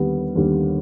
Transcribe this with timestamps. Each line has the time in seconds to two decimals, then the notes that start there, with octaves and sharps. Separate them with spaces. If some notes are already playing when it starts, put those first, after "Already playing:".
Already playing: D#2 D3 G3 B3
0.35 D#2 D3 G3 B3